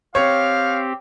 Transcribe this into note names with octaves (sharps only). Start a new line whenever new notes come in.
C4 G4 C#5 F5